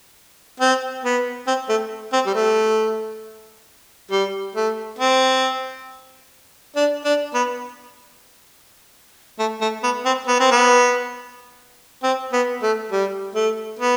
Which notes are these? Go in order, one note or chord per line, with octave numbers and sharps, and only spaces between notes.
C4
B3
C4
A3
C4
G3
A3
G3
A3
C4
D4
D4
B3
A3
A3
B3
C4
B3
C4
B3
C4
B3
A3
G3
A3
B3